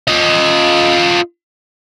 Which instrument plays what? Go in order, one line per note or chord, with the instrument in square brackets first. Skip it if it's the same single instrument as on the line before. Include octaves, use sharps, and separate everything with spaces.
[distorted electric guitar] F4 D#5